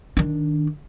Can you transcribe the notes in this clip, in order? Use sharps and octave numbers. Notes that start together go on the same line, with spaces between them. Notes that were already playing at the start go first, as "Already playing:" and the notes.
D#3 D4